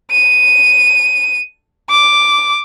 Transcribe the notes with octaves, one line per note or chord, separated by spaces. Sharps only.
D#7
D6